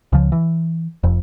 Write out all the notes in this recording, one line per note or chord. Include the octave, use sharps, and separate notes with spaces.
C#2 C#3 F3
E3
F1 F2